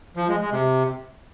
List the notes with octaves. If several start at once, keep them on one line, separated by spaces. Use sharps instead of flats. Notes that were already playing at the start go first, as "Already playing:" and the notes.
F3
G#3
G#3
C3